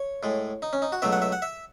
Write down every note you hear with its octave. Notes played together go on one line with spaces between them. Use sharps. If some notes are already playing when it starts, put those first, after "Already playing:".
Already playing: C#5
A2 G#3
D#4
C#4
D#4
F#4
C#2 B2 F#3 A3 E5
F#5
E5
F#5
E5